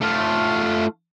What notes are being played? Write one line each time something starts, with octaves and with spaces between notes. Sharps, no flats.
A3 F4